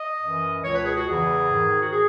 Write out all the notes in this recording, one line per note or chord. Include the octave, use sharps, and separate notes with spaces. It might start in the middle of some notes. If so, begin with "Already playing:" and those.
Already playing: D#5
F#2 E3
C#2 B2 C#5
B4
G#4
F#4
E2 C#3 E3 G#4
G#2 D#3
F#4
G#4